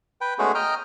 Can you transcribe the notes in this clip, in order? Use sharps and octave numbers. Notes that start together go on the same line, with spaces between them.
B4 G5
G#3 A3 B3 C#4 F#4 G#4
D#5 G5 A#5 F6